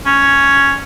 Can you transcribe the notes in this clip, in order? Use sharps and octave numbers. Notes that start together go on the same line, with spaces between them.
C#4